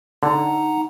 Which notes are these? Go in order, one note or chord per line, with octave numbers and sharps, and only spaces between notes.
D3 D#4 F#5 A#5